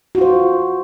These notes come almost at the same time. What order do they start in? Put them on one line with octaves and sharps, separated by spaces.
F#4 F4 C5